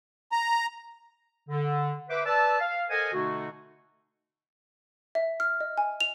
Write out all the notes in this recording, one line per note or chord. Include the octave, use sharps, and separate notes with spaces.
A#5
D3
B4 C5 E5 D6
B4 D5 A5 E6
F5
A4 A#4 C5 D#5 F#5 G#5
B2 D3 A3 D#4 F#4
E5
F6
D#5
G#5
F7